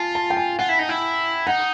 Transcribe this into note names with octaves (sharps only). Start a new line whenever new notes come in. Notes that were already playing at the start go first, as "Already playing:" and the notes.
Already playing: F4 G#5 A5
A5
G5
G#5
F4 F#5
E4
D#4
E4
D#4 F#5